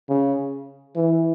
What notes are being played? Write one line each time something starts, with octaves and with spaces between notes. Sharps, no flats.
C#3
E3